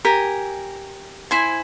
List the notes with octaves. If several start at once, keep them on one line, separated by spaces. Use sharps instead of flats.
G4 A#4 G#5
E4 C5 G#5